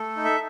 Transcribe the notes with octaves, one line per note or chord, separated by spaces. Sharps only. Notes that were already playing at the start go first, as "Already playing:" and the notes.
Already playing: A3 A4
D#4
E5